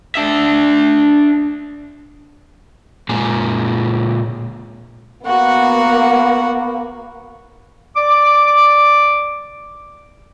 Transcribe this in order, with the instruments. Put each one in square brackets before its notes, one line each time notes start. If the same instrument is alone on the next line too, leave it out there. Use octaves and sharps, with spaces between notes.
[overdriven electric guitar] D4 E5
[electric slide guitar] A#2 G#3 G#4
[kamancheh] A#3 B3 [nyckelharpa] F#4 F#5
[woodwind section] D5 D6